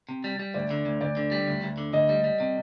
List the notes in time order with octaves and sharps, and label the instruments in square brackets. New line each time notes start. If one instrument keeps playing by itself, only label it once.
[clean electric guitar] C3
G3
G3
[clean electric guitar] D2 [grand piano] D5
[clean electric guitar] D3
D2
[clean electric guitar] D2 [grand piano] D5
[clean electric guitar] D3
G3
D2
D2
D3
[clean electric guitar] D2 [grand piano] D#5
[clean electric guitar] G3
G3
C3